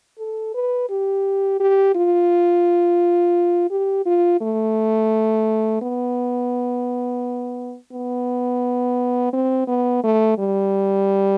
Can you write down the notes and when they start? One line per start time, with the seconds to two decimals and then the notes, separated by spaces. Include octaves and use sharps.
0.19 A4
0.55 B4
0.90 G4
1.60 G4
1.95 F4
3.71 G4
4.06 F4
4.41 A3
5.82 B3
7.93 B3
9.33 C4
9.68 B3
10.04 A3
10.39 G3